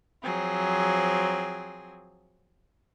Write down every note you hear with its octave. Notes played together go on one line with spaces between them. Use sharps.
F3 F#3 C4 G#4